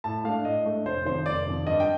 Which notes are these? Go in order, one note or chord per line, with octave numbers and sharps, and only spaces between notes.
A2 A5
A3 D4 F5
A2 D#5
A3 D4
F1 C5
F2 D#3 C5
F1 D5
F2 D#3
G2 D#5
G5